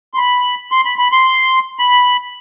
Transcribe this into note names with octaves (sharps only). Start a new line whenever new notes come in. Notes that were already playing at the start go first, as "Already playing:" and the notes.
C6
B5
C6
B5
B5
C6
B5